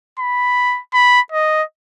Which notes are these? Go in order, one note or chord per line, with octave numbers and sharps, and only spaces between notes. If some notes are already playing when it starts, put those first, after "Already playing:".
B5
B5
D#5